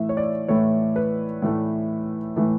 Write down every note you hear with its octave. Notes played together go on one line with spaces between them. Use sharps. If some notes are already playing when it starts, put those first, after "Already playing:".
Already playing: A2 E3 A3 E5
C#5
D5
A2 E3 A3 C#5
B4
A2 E3 A3
A2 E3 A3